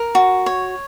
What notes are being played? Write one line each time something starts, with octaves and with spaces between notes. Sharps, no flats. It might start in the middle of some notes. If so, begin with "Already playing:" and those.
Already playing: A#4
F#4
C#5